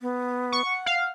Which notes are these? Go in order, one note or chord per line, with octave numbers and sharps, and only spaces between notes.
B3
C#6
F#5
F5